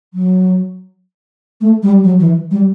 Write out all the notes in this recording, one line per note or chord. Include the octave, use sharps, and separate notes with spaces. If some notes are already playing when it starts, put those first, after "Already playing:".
F#3
A3
G3
F#3
E3
G3